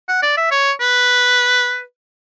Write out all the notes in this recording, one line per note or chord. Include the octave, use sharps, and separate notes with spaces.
F#5
D5
E5
C#5
B4